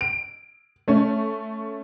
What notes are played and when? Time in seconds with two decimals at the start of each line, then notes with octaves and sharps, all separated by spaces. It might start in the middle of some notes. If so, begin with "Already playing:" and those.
0.01 D7
0.88 A3 C#4